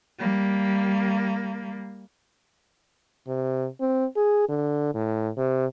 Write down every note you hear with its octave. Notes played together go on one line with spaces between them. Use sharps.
G3 A#3
C3
C4
G#4
D3
A2
C3